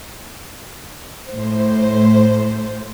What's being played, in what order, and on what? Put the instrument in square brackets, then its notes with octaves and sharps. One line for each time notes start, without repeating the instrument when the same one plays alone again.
[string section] A2 C5